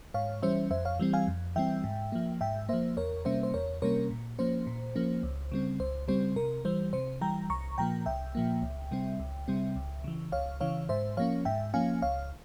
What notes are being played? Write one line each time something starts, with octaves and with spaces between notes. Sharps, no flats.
G#2 C#5 F5
E3 G3 C#4 C5 E5
F2 C5 E5
C#5 F5
E3 G3 C4
F5 G#5
F2
E3 G3 C4 E5 G5
G#2
F3 A#3
G#2 E5 G5
F3 A#3 C5 E5
E2 A#4 C#5
C3 G3 A#3 C#4 C5 E5
C5
E2 A#4 C#5
C3 G3 A#3 C#4 A#4 C#5
A#2
F3 A#3 C#4 C5
A#2
F3 A#3 C#4
C#2
C#3 G3 C4
C#2 C5
C#3 G3 C4 C5
C3 A#4
E3 G3 C5
C3 C5
E3 G3 G5 A#5
C2 A#5 C#6
A#2 F3 A#3 G5 A#5
C2 E5 G5
A#2 F3 A#3
C#2
C3 G3 C4
C#2
C3 G3 C4
C#2
C#3 E3
C#2 C#5 F5
C#3 E3 C#5 F5
G#2 C5 E5
F3 A#3 C#4 C#5 F5
G#2 E5 G5
F3 A#3 C#4 F5 G#5
C#2 C#5 F5